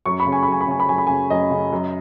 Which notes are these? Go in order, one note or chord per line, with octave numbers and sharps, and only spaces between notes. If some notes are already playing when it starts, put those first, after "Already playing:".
F#2 C#6
B5
C#3
G#5
B5
F#2 G#5
B5
C#3 G#5
B5
F#2 G#5
B5
C#3 G#5
F#2 D#5
C#3
F#2